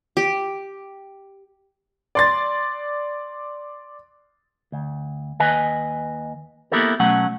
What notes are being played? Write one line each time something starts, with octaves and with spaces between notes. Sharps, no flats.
G4
D5 C6 A6
D2
D#2 B4 D#5 G#5
A#3 B3 E4 G4 A4 A#4
B2 F#3 A3 C#4 F#5